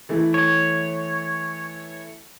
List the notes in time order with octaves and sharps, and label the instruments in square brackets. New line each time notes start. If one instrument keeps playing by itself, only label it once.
[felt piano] E3 A3 E4
[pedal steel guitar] C#5